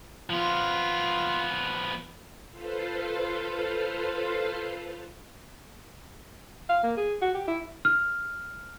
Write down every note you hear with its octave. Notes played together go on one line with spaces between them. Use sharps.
F3 B3 F4
F4 A4 B4 C5 F5
F5
A#3
G#4
F#4
G4
E4
F6